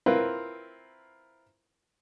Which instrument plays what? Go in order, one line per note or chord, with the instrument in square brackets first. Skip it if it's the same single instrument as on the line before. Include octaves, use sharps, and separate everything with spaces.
[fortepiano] C4 E4 F4 A#4 B4